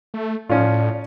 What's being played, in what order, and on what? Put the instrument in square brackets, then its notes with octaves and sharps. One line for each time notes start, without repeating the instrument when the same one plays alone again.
[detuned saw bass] A3
[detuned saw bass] A2 [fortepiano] F3 C#4 F4 [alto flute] D5